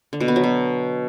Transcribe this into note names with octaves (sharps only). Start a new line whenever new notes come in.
D3
B2
B3
F#3
B2